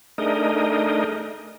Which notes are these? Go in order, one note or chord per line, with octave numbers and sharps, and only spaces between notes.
A3 D4 D#4 G#4 A#4 D#5